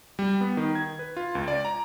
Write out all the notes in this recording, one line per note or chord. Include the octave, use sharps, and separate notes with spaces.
G3
B3
D#3
G#6
B4
F4
C#2
D5
A#5